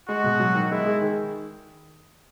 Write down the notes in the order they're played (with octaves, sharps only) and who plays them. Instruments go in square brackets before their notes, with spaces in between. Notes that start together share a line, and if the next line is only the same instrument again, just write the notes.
[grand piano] G#3 [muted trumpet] F#4
[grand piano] B2
F#3
D#3
[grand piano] G#3 [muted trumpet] E4
[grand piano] G#4
D#3